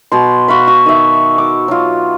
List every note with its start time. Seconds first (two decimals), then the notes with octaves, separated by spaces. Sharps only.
0.12 B2 C6
0.48 F#4 F5 B5
0.67 F#4
0.86 D#3 E5
1.38 D6
1.68 F#3 F4